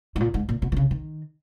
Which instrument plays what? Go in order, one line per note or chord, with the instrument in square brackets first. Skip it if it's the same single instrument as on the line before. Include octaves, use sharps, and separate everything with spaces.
[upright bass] G#2
A#2
G#2
A#2
B2
D#3
C#3
D#3